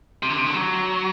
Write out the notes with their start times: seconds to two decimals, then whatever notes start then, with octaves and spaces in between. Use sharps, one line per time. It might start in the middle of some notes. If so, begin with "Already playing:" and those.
0.23 C3
0.30 D3
0.39 C3
0.46 D3
0.55 F#3